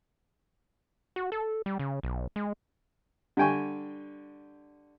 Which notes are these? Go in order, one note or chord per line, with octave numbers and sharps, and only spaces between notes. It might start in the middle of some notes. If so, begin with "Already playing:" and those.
F#4
A4
G3
C#3
B1
G#3
D3 G3 G5 G#5 C#6